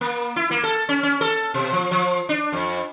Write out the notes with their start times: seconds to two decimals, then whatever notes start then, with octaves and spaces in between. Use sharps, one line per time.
0.01 A#3
0.36 E4
0.51 A#3
0.64 A4
0.89 C#4
1.03 C#4
1.21 A4
1.54 B2
1.73 F3
1.91 F3
2.29 D4
2.52 F2